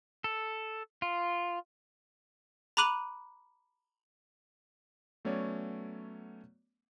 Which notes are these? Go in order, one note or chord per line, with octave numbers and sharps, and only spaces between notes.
A4
F4
A#5 B5 D6 F#6 D#7 F#7
F#3 A3 B3 C#4 C#5 D5